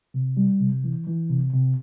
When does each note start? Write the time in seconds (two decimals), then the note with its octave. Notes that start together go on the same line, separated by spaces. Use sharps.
0.14 C3
0.37 G3
0.60 C3
0.84 E3
1.07 E3
1.30 C3
1.53 C3